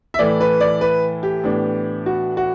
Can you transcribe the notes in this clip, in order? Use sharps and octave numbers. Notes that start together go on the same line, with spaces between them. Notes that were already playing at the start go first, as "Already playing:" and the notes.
E5
A2 E3 A3 E4 D5
B4
D5
B4
G4
A2 E3 B3 D4
F#4
F#4